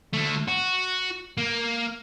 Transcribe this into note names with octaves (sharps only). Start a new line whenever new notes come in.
D3 A3
F#4
A#3